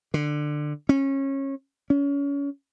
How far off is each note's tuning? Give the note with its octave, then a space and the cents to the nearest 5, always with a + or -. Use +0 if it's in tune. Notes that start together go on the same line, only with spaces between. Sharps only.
D3 +20
C#4 -25
C#4 +30